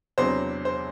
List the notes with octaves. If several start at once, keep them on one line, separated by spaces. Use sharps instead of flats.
E2 C3 F#3 B3 D4 C5
C5